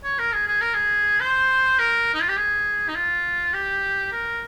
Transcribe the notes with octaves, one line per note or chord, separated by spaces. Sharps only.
C#5
A#4
G#4
G#4
A#4
G#4
C5
A#4
D#4
F4
G4
G#4
D#4
F4
G4
A#4